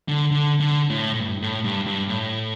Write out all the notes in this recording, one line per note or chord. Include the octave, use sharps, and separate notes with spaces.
D3
D3
D3
A2
A2
G2
A2
G2
G2
A2